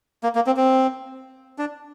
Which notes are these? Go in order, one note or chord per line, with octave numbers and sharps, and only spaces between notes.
A#3
A#3
C4
C4
D4